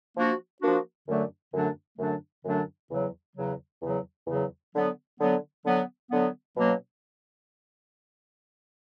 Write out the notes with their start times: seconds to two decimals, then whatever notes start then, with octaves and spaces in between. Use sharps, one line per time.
0.16 F3 A#3 D4 F#4
0.61 F3 A#3 D4 F#4
1.07 F#2 D3 F#3 A3 D4
1.53 F#2 D3 F#3 A3 D4
1.98 F#2 D3 F#3 A3 D4
2.45 F#2 D3 F#3 A3 D4
2.90 E2 C#3 F#3
3.36 E2 C#3 F#3
3.82 E2 C#3 F#3
4.27 E2 C#3 F#3
4.73 D3 F#3 B3
5.20 D3 F#3 B3
5.65 D3 F#3 B3
6.10 D3 F#3 B3
6.56 B2 F#3 A#3 C#4